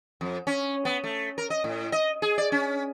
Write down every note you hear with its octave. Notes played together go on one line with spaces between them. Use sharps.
F2
C#4
B3
A3
A#4
D#5
A2
D#5
G#4
D5
C#4